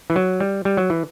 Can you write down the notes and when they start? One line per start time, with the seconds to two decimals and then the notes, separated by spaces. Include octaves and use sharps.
0.10 E3
0.16 F#3
0.40 G3
0.65 G3
0.77 F#3
0.90 E3